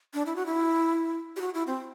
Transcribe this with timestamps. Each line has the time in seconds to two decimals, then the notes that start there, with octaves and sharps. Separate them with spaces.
0.14 D4
0.26 E4
0.36 F#4
0.46 E4
1.36 G4
1.41 F#4
1.54 E4
1.67 C4